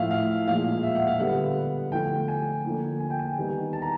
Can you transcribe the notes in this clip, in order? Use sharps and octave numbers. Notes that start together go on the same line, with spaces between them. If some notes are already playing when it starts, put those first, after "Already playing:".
Already playing: A2 F3 A3 E5 F5
F5
A#2 F3 G#3 F5
E5
F#5
F5
D3 G3 B3 F#5
D3 F3 A3 G5
G#5
D3 F3 A#3
G#5
G5
G#5
D#3 G3 B3
A5
A#5